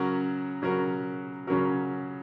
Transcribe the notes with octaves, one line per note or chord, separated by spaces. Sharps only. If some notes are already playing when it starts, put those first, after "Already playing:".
Already playing: C#3 F#3 C#4 F#4 A#4
C#3 F#3 C#4 F#4 A#4
C#3 F#3 C#4 F#4 A#4